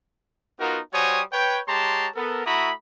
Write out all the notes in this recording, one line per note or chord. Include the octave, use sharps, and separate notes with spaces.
B3 D#4 F4 F#4 A#4
G3 F#4 C5 C#5 G#5 D#6
B4 C#5 G5
G#3 G4 C#5 A5 A#5 C6
B3 A4 A#4
A3 E4 F#4 A#5 B5 D#6